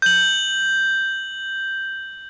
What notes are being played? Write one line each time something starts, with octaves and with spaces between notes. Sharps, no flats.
G6 F#7